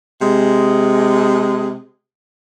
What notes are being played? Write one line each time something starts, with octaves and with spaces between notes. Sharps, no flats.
C3 G#3